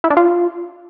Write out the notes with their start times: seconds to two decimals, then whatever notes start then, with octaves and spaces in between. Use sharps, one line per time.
0.04 E4
0.10 D4
0.17 F4